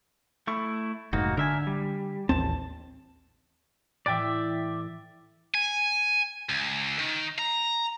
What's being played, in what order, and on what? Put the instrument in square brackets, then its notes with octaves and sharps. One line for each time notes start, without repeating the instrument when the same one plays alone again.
[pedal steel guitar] A3 E4 C#6
[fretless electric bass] F1 G#2 [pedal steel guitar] A#3 D#4 F#4
[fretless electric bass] D3 [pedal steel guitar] A#4 E5 G#5
[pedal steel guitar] G3
[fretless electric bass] A1 D#2 C4 [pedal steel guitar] A5
[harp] A2 E3 [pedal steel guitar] D5 E5 [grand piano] G5 A6 D7
[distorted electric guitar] G#5
C#2
D#3
A#5